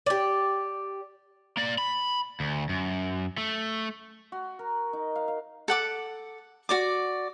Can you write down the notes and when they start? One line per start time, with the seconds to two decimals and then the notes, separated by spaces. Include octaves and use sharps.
0.06 G4 D5
1.57 A#3 D5
1.78 B5
2.40 D2
2.69 F#2
3.38 A3
4.32 F#4
4.59 A#4
4.93 D#4
5.16 F5
5.28 F5
5.68 A4 F#5 D6
6.69 F#4 D5 D6